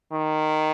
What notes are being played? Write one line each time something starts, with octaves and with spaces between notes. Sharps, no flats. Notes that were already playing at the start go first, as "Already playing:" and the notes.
D#3